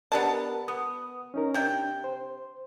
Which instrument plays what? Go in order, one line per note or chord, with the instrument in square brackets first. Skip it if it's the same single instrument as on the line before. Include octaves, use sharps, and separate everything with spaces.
[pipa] B3 D4 A5 [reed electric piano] G4 A#4
[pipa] B3 [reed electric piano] D#6
[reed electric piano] C#4 D#4 A#4
[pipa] C3 G5 [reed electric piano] D4
[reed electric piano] C5